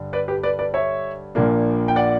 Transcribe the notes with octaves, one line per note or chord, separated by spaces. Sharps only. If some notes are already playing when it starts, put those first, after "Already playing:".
Already playing: G2 D3
B4 D5
G4 B4
B4 D5
B4 D5
C#5 E5
A#1 A#2 A#3 D4
G5
D5 F#5